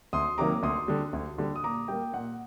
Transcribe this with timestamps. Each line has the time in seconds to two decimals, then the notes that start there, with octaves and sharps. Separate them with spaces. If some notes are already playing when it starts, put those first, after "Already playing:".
0.13 D2 C6 D#6
0.38 C3 D#3 F#3 A#3 A#5 D6
0.63 D2 C6 D#6
0.88 D3 G3
1.13 D2
1.38 D3 G3
1.56 D#6
1.63 A#2 A#5 D6
1.88 G3 A#3 G5
2.13 A#2 F#5